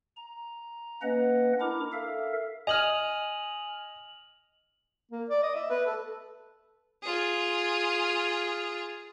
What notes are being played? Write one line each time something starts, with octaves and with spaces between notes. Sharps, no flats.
A#5
A#3 C#4 B4 D#5 F#5
D4 E4 A#4 A#5 D6
A4 A#4 E5 F5
D#5 G#5 D#6 F6 F7 F#7
A#3
D5
D#5
E5
B4
A4
F4 G#4